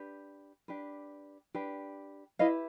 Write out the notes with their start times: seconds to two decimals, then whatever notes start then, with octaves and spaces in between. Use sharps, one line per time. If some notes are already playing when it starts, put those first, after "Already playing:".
Already playing: D4 G4 B4
0.68 D4 G4 B4
1.55 D4 G4 B4
2.39 E4 G4 B4 D#5 F5